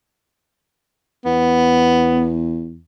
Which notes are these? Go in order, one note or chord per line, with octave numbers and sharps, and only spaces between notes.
E2 B3